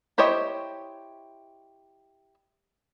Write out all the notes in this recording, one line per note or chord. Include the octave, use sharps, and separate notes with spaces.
E4 G4 C5 C#5 D#5